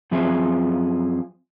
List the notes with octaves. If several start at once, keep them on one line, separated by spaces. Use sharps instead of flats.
F#2 F3 C4 G#4 E5